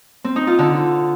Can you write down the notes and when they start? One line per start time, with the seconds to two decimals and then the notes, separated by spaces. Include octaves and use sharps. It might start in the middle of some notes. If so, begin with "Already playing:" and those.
0.24 C4
0.36 D#4
0.47 F4
0.59 D3